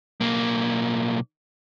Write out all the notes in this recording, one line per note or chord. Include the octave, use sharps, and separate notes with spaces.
B1 A#3